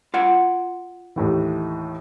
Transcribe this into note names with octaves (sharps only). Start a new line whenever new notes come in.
F4 D5 F#5
D#2 A2 E3